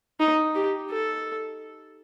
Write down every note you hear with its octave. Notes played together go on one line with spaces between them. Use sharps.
D#4
G4
A4